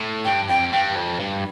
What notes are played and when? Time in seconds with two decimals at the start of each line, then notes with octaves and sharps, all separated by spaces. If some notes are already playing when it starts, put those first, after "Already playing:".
Already playing: A2
0.25 G2 G5
0.48 F2 G5
0.73 G2 G5
0.95 F2
1.20 G2